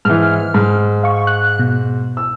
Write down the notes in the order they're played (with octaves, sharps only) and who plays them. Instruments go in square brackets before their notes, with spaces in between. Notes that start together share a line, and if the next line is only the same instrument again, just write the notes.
[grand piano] G#2 E3 [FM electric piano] F6
[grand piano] G#2
[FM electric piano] F5 C#6
F#6
B2
[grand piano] E6